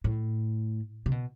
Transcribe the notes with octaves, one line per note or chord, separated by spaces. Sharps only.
A2
C3
B2